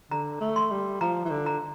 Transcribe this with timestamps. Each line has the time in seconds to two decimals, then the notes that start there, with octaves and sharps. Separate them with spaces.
0.11 D3 A#5
0.41 A3
0.56 C6
0.71 G3
1.01 F3 A#5
1.25 E3
1.31 D3
1.46 A#5